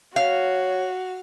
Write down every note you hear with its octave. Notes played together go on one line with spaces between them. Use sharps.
F#4 C#5 F5